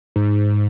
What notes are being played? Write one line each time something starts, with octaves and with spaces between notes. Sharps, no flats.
G#2